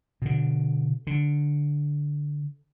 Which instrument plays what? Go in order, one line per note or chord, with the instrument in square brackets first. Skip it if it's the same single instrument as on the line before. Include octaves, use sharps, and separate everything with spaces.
[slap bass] B2 D3
D3